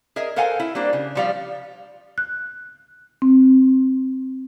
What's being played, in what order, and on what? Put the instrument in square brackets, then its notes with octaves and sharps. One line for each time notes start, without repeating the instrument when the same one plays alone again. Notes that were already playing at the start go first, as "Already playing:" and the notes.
[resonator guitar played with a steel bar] G#4 A#4 D#5 E5
A4 A#4 C5 F5 F#5 G#5
E4
G3 A#3 D4 C5
C#3
F3 G3 F5
[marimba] F#6
C4